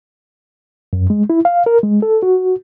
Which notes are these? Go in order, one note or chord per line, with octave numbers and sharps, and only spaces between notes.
F#2
G#3
E4
F5
A#4
G#3
A4
F#4